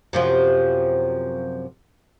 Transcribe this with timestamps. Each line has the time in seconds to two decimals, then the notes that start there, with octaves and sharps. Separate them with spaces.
0.13 F#2 C3 F3